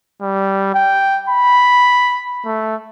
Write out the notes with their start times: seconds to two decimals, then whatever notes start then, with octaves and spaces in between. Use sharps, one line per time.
0.22 G3
0.74 G5
1.29 B5
2.46 A3